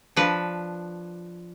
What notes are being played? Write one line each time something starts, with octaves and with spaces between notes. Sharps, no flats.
F3 D4 B4